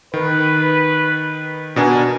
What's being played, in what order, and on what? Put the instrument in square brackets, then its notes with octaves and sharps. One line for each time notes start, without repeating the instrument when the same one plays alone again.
[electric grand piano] D#3 [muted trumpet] B4
[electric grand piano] B2 D4 G#5 [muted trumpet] A#4